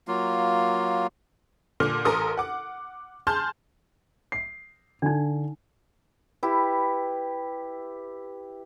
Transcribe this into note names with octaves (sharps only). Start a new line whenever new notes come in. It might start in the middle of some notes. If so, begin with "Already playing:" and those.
F#3 A#3 F4
A#2 D3 F6
A1 A4 A#4 C6 D#6
F#5 D6
G#4 A5 C6 F6 G6
C7
D3 D4 D#4
E4 G4 B4